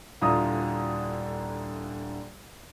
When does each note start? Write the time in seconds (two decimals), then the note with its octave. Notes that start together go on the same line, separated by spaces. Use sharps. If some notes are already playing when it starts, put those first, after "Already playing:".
0.21 D#1 D3 E4 F4 A#5 D#6